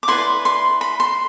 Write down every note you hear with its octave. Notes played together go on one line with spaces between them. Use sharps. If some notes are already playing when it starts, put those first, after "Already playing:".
D6
E4 B4 D5 C6
C6
B5
C6